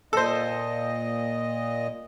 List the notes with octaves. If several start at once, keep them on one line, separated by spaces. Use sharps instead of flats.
A#2 A4 C5 D#5